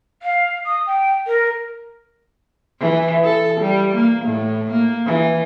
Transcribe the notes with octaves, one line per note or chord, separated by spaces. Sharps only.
F5
D#6
G5
A#4
E3
A4
G3
A#3
A2
A#3
E3